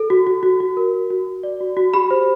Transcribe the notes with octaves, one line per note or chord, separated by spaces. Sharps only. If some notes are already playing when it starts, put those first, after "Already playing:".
Already playing: A4
F#4
F#4
F#4
F#4
A#4
F#4
F#4
F#4
D5
F#4
F#4
G4 B5
C5